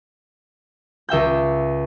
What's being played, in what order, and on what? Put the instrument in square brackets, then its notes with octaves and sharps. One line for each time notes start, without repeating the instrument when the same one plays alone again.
[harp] C#2 E5 G5 G6